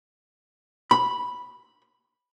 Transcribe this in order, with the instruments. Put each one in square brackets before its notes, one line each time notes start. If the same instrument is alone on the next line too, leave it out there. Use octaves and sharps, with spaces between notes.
[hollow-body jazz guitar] B5